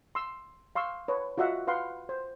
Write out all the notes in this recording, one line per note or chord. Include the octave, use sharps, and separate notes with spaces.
C6 E6
F5 C6 C#6 E6
B4 C#5
F4 F#4 D#5 E5 F#5
B4 F5 F#5 C6
C5